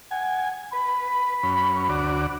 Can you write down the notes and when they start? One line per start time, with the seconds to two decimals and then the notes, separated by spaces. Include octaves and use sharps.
0.11 F#5 G#5
0.73 B4 B5
1.43 F#2 C#4
1.89 D2 F#4 D5